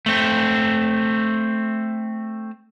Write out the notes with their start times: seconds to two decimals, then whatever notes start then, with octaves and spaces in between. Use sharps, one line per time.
0.06 A3 C4